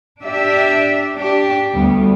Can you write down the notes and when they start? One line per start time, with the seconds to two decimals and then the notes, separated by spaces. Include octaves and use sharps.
0.22 D4 G4 D5 E5
1.16 D4 G4
1.72 D2 G3 B3